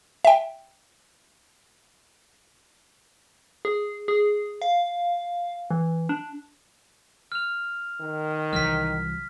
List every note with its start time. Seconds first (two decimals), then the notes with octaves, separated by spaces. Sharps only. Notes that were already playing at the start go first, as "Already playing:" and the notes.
0.25 E5 G5
3.65 G#4
4.08 G#4
4.62 F5
5.71 E3
6.09 D4
7.32 F6 F7
8.01 D#3
8.53 C2 E3 F#3 F6 B6